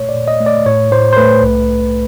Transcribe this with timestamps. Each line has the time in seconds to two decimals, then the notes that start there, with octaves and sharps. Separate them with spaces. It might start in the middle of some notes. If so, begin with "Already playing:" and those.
Already playing: A#2 A3 C#5
0.09 D5
0.15 A#2
0.28 D#5
0.40 A3
0.46 D5
0.66 A2 C#5
0.92 A2 C5
1.13 C5
1.17 A3 B4
1.43 C2
1.68 C2